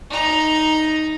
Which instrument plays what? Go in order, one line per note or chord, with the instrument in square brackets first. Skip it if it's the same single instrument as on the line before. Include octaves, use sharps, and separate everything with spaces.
[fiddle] D#4 A#5